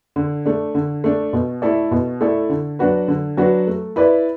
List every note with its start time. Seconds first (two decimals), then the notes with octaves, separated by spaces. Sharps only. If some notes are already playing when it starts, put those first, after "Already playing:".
0.16 D3
0.46 A3 D4
0.75 D3
1.04 A3 D4
1.33 B2
1.62 A3 E4 A4 D5
1.91 B2
2.21 A3 E4 A4 D5
2.49 D3
2.79 F#3 D4 F#4 B4
3.08 D3
3.37 F#3 D4 F#4 B4
3.67 A3
3.96 E4 B4 D5